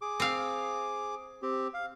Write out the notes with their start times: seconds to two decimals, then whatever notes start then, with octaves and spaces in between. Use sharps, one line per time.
0.02 G#4 D6
0.20 C4 F5
1.42 C4 G4
1.74 F5